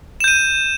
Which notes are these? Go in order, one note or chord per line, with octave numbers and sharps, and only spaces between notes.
G6 D#7 E7